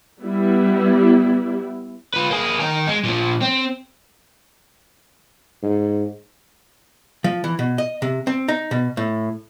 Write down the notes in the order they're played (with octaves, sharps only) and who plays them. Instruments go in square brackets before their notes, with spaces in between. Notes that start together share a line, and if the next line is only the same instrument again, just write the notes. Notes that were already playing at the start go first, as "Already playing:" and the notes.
[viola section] G3 B3 E4
[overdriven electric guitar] F4 B4
A#3 G#4
D#3 A#4
G#3
A#2 F3
C4
[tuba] G#2
[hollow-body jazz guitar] F3
E3
B2
D#5
C3
C4
D#4
B2
A2